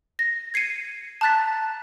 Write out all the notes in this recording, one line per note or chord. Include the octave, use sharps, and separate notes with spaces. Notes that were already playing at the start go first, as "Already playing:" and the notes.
A#6
G#6 C7 C#7 D#7
A5 A#5 F#6 A6 B6